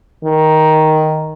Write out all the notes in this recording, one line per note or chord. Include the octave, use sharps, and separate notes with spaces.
D#3